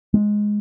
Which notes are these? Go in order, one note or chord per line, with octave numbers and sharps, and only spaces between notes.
G#3